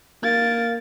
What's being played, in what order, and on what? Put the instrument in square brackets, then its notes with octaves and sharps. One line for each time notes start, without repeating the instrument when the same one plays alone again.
[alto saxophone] A#3 [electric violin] A6